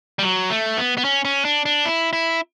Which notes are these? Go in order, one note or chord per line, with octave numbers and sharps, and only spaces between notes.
G3
F#3
A3
B3
B3
C#4
C#4
D4
D4
E4
E4